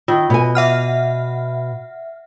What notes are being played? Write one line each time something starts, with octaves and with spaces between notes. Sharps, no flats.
D#3 F4
B2 G#5
E5 F#5 F6